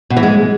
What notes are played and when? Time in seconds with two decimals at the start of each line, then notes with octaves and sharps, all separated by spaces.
0.10 B2
0.17 E3
0.23 G#3